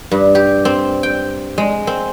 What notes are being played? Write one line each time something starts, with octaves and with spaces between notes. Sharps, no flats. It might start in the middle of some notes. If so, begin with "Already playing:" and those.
G2
G4
C4
G5
G#3
C4